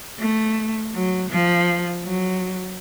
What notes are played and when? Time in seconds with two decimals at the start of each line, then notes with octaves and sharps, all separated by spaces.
0.20 A3
0.94 F#3
1.30 F3
2.04 F#3